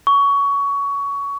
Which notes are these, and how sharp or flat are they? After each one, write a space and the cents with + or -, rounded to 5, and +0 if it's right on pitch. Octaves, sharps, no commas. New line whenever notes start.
C#6 +20